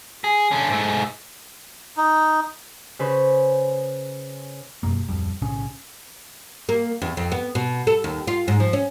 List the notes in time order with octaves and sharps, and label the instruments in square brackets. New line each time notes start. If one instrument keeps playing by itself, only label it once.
[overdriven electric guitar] G#4
D3 C#4
G#2 A3
[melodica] D#4
[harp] C#3 B4 C5
[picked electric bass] F1 F#2 B2 A#3
D1 F2 G3
B1 A2 C#3 C#4
[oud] A#3
E2
F2
B3
B2
A4
D#2
F4
G#2
F3
C#4